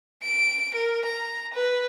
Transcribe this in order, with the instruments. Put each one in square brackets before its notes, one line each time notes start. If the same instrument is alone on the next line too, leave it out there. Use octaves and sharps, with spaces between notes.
[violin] D7
A#4
A#5
B4